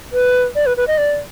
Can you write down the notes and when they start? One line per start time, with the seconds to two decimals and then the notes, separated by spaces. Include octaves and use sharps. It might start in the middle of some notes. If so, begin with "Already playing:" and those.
0.13 B4
0.55 D5
0.66 B4
0.77 B4
0.88 D#5
0.98 D5